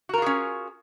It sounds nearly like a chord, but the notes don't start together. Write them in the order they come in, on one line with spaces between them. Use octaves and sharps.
F#4 A#4 F4 G#4 C#4